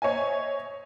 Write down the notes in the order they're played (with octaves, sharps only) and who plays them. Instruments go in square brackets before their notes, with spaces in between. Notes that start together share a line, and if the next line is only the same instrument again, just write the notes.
[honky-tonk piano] C5 C#5 D#5 E5 G#5